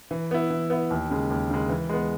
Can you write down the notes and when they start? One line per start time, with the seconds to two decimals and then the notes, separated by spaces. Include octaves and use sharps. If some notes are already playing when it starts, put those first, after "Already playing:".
0.11 E3
0.31 B3 E4
0.50 E3
0.70 B3 E4
0.90 D#2
1.10 C#3 G#3
1.30 D#2
1.50 C#3 G#3
1.69 E3
1.89 G#3 B3